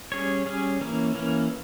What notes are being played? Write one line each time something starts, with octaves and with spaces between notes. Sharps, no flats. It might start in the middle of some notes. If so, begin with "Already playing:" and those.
G3 C#4 G#4 C#5
G3 C#4 G#4 C#5
E3 A#3 C#4
E3 A#3 C#4